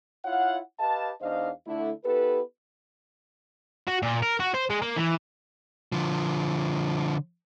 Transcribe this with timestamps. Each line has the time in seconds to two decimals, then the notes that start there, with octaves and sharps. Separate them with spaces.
0.25 E4 F4 C#5 F5 F#5
0.79 G4 B4 D#5 F5 A5
1.21 E2 D4 D#4 C5 D#5 F5
1.66 D3 A3 E4
2.04 B3 E4 G4 A4 B4
3.87 F#4
4.02 A#2
4.22 A#4
4.40 F#4
4.54 C5
4.70 G#3
4.82 A#3
4.96 E3
5.92 D3 F3